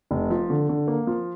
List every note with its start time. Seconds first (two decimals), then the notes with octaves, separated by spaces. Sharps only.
0.11 F1
0.30 F3
0.50 D3
0.69 D3
0.87 A#3
1.07 F3